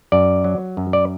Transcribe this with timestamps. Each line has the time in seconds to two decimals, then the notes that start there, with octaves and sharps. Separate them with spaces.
0.12 F#2 D5
0.44 F#3
0.77 F#2
0.93 D5